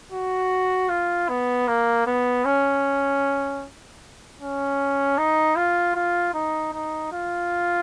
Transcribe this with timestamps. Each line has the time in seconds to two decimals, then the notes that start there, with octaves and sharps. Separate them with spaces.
0.12 F#4
0.89 F4
1.29 B3
1.67 A#3
2.07 B3
2.45 C#4
4.40 C#4
5.18 D#4
5.56 F4
5.95 F4
6.34 D#4
6.73 D#4
7.12 F4